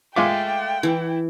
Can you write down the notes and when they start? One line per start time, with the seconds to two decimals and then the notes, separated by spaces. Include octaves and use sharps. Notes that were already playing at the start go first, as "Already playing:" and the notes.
0.16 G#3 F4 A4 E5 G5 D6
0.83 E3 E4